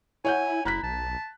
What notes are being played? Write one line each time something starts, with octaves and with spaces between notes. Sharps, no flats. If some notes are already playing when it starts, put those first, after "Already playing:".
E4 C#5 F#5 G#5 G6
F#1 E4 A#5 F#6 B6
B1 A5